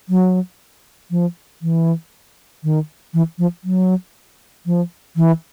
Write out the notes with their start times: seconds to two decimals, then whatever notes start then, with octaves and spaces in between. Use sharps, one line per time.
0.09 F#3
1.11 F3
1.62 E3
2.64 D#3
3.14 E3
3.38 F3
3.64 F#3
4.66 F3
5.16 E3